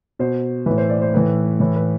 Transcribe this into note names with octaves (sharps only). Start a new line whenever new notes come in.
B2 C5
A2 E3 B4
C5
D5
C5
A2 E3 B4
A2 E3
B4